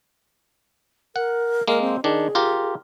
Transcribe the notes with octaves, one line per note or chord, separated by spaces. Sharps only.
A#4 F#5
G#3 A#3 A#4
C4
D#3 D4 G#4
F4 G4 A#4